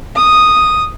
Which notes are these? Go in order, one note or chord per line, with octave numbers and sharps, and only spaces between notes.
D#6